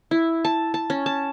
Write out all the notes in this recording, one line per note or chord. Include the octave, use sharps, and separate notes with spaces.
E4
A5
A5
C#4
A5